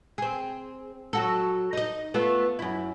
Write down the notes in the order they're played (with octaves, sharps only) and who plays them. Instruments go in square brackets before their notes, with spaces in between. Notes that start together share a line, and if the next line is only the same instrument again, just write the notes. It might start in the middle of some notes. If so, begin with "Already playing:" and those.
[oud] C4 G#4
F#3 F#4 A4
D#4 D#5
A3 B3 F4
F#2 E4